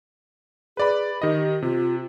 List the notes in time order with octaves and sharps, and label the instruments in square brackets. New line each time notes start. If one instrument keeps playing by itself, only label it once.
[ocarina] G#4 [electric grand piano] B4 D5 B5
[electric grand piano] D#3 D#5 [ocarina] G4
[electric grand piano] C3 [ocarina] F4